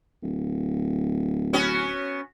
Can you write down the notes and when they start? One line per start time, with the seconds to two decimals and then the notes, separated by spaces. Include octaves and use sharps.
0.23 D1
1.53 B3 C#4 F#4